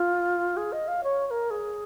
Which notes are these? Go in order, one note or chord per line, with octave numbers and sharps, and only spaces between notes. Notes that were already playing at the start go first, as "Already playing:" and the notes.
Already playing: F4
G#4
D#5
F5
C#5
C#5
A#4
G#4